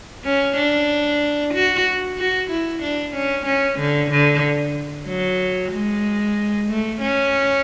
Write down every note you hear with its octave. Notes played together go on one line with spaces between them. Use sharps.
C#4
D4
F#4
F#4
E4
D4
C#4
C#4
D3
D3
F#3
G#3
A3
C#4